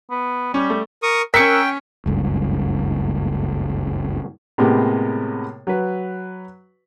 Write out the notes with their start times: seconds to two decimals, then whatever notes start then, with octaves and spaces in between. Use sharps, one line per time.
0.10 B3
0.54 G3 C#4
0.70 A3
1.03 A#4 C#6 D#6
1.34 C#4 A#4 G5 E6 F#6 B6 C#7
2.06 F#1 C#2 G2
4.58 A2 C3 G#3 A#3 B3 G4
5.67 F#3 B4